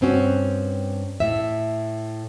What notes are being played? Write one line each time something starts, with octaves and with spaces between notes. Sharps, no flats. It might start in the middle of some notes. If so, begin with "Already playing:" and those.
G2 C4 C#4 F#4
A2 E5